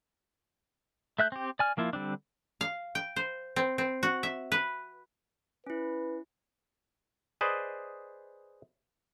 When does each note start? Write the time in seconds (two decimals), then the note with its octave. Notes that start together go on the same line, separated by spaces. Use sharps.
1.19 A3 E5 F#6 G6
1.32 C4 G4
1.59 D5 G#5 F6
1.77 F3 A#3 E4 F4
1.93 D3 G3 C4 D4
2.61 F5
2.95 G5
3.16 C5
3.56 C4
3.78 C4
4.03 F#4
4.23 E5
4.52 B4
5.67 C#4 E4 B4
7.41 G#4 B4 C5 D5 D#5